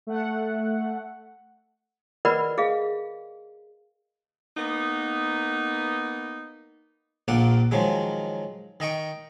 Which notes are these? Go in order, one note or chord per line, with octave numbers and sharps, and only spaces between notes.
A3 F#5
A#4 B4 D5 D#5 F#5 B5
G#4 D#5 F5
A#3 B3 D#4
A#1 A#2 A#3 F#5 D6
D#3 F3 F#3 G#3
D#3 D#5 G5 C#6